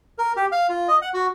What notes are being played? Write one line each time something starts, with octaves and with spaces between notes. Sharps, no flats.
A#4
G4
F5
F4
D#5
F#5
F#4